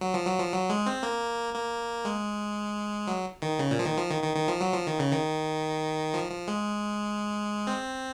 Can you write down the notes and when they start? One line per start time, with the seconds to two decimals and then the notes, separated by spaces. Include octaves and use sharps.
0.01 F#3
0.14 F3
0.27 F#3
0.40 F3
0.53 F#3
0.70 G#3
0.86 C4
1.03 A#3
1.54 A#3
2.05 G#3
3.07 F#3
3.42 D#3
3.59 C#3
3.71 A#2
3.79 F3
3.85 D#3
3.97 F3
4.10 D#3
4.23 D#3
4.35 D#3
4.48 F3
4.61 F#3
4.74 F3
4.87 D#3
4.99 C#3
5.12 D#3
6.14 F3
6.31 F3
6.48 G#3
7.67 C4